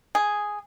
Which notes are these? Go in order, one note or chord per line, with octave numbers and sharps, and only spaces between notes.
G#4